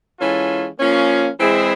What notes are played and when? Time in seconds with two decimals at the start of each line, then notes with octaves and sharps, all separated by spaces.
0.19 E3 G#3 C#4 F4 A4
0.80 F3 A#3 C#4
1.39 E3 G#3 C4 E4 G#4